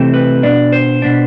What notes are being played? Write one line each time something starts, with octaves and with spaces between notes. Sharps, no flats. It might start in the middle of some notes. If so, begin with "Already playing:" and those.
Already playing: C3 E3 A3 C4
B4
B2 B3 D4 D5
C5
B2 B3 D4